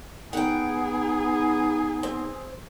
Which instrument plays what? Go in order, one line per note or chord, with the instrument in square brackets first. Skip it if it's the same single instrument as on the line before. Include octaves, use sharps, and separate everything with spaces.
[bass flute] B3 [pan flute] D#4 [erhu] G#4 [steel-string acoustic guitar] F#5 G5
[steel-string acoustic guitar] C4